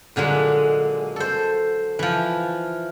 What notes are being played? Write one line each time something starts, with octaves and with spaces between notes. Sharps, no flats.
A#2 D3 F#3 G#3
A4 C5
E3 F3